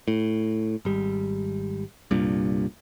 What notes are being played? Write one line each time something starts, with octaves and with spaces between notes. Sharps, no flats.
A2
G#1 G3
C2 G2 A#2